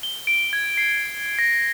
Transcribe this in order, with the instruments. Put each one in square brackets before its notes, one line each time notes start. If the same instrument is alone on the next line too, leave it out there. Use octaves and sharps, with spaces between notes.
[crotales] G7
D7
G#6
C7
A#6